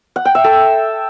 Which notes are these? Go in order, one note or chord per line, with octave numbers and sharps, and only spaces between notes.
F#5
G5
E5
A4